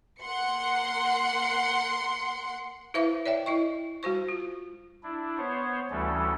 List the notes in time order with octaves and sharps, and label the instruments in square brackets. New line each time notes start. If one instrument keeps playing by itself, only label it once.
[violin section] A#3 F#5 C6 C#7
[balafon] E4 B4 C5 E5 F5 D6
C#5 D5 E5 G5
E4 D#5 C#6
G3 F#4 C5 C#6
F4
[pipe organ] D4 E4
B3 C5 C#5
D2 E3 G3 C#4 A4